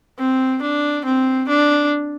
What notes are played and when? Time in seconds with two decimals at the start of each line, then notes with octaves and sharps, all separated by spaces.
0.19 C4
0.62 D4
1.05 C4
1.48 D4